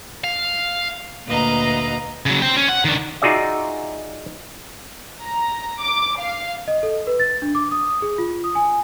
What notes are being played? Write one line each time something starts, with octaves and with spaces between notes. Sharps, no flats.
F5
D2 A#2 B4 D#5 F5 A#5
C#3 F#3
C5 G5
C#4
F#5
D#3 D4
D#4 F4 F#4 G#4 D5 E5
A#5
D6
F5
D#5
A4
B4
A6
D4
D6
D#6
G#4
F4
D#6
G#5